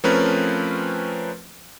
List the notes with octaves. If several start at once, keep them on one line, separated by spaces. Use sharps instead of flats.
F3 A3 C4 C#4 A#4 B4